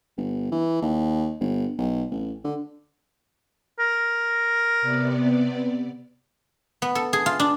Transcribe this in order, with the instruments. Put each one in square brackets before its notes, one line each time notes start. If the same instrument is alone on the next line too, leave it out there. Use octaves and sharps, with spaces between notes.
[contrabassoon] G1
E3
D#2
G1
B1
A1
D3
[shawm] A#4
[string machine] C3 B3 D5
[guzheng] B3
A4
G#4
F4
D4